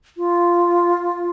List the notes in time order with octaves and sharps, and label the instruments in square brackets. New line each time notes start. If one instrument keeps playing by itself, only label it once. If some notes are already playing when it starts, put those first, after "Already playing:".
[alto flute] F4